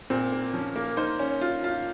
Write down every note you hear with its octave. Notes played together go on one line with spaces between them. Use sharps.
A#2 C4
A#3
F3 C#4
A#3
D#4 C5
C#4
F4
F4